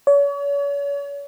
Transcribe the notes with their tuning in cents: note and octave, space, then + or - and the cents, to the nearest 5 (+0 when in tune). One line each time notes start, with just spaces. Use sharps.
C#5 +40